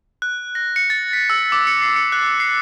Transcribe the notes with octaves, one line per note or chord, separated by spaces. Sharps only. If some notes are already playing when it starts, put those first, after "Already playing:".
F#6
A#6
C#7
A6
B6
E6
D6
C#7
C7
C#7
F#6
C7